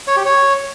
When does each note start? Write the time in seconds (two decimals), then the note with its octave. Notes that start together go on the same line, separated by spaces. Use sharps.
0.07 C#5
0.16 G4
0.26 C#5